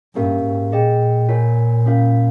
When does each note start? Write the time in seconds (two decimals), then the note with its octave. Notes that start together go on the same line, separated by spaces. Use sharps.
0.15 G2 A#3 C#4 G4 A#4 F5
0.44 G#2
0.72 A#2 G#4 D#5 G5
1.29 F4 A#4 C#5 G#5
1.86 C#4 F4 A#4 F5